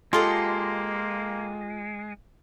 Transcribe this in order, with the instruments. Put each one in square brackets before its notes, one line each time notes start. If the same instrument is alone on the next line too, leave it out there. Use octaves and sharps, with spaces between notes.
[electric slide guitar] G#3 [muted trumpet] A#3 [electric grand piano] F4 C6 F6 [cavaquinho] G4 A4 D#5